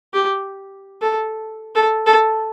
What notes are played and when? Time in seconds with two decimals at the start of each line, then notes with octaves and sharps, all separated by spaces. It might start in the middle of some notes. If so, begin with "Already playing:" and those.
0.14 G4
1.01 A4
1.75 A4
2.06 A4